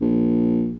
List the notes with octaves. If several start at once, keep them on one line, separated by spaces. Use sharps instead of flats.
A#1